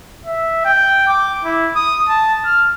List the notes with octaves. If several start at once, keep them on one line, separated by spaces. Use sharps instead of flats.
E5
G5
D6
E4
D#6
A5
F6